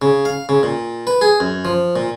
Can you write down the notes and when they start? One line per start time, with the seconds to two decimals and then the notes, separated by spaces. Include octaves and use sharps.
0.02 C#3
0.25 F5
0.49 C#3
0.63 A#2
1.07 B4
1.21 G#4
1.40 F#2
1.65 F3
1.96 A#2